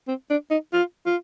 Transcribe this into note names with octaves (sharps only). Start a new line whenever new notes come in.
C4
D4
D#4
F4
F4